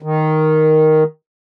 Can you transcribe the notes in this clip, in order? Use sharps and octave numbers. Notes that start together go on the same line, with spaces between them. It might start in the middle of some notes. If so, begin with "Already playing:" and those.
D#3